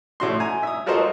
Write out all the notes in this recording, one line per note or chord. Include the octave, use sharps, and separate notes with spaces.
A2 F#4 C6
G#5 A#5
E5 D#6
F4 F#4 A4 A#4 C5 D#5